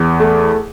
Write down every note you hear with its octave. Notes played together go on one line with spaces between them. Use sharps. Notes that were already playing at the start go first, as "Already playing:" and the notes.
Already playing: E2
A3